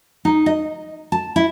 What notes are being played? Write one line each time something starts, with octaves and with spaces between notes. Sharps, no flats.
D#4
D#5
A5
E4